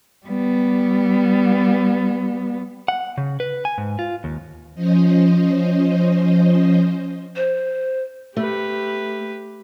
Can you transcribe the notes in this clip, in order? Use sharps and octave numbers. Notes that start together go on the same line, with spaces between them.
G3 B3
F#5
C#3
B4
G#5
G#2
F4
D#2
F3 C#4 C5 D#5
C5
A3 G4 B4